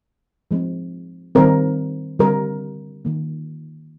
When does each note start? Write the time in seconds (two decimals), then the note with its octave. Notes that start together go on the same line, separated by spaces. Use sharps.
0.51 F3 G#3 C4
1.35 D#3 G3 C4 A#4
2.19 D3 G3 C4 A#4
3.05 D#3 A#3